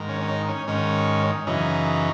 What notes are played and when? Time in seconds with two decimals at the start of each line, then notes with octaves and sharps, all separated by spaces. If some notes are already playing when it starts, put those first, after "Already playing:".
Already playing: G#2 D#3
0.09 C#4
0.21 C#4
0.28 D#4
0.49 C#4
0.68 G#2 D#3 C#4
1.47 F#2 C#3 E3 D#4